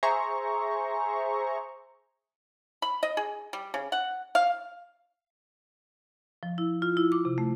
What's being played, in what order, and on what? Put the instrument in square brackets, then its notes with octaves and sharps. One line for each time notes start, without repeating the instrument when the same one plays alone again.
[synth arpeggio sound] G#4 C5 E5 A#5 C#6
[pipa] B5
D#5
G#4
G3
C#3
F#5
F5
[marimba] F3
E4
F4
E4
D6
C3
A3